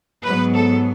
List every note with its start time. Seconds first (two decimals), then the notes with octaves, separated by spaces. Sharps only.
0.23 G#2 F#3 B3 B4
0.54 A4